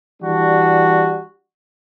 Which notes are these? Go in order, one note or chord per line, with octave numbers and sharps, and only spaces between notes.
E3 G3 D4 F#4